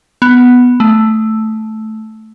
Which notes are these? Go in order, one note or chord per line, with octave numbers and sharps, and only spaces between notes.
B3
A3